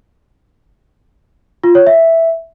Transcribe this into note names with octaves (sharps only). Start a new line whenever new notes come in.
F4
C#5
E5